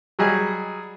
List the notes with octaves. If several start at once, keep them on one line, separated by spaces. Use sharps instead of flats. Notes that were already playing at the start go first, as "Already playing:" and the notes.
F#3 G3 G#4 D#5